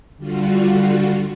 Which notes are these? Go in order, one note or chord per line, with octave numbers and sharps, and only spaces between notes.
D3 G3 F4 F#4